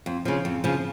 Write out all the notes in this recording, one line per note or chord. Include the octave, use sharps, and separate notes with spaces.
F2
C#3 F3
F2
C#3 F3